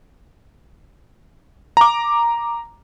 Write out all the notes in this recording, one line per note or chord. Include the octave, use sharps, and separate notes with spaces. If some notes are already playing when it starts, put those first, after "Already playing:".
A#5 D6